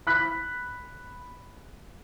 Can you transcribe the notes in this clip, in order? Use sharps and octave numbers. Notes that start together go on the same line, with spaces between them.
B5 F#6 B6